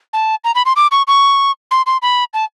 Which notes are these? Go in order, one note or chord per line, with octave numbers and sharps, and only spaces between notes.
A5
A#5
B5
C6
D6
C#6
C#6
C6
C6
B5
A5